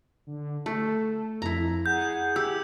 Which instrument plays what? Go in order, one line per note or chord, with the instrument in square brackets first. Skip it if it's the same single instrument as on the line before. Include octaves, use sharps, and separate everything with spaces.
[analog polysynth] D3
[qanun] A3 [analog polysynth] A4
[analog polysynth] F2 [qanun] E4 A#5
[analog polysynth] G#4 F#5 G#5 [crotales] G6
[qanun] G4 [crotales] E6 G6